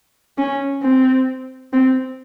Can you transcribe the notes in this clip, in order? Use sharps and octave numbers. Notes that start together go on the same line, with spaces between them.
C#4
C4
C4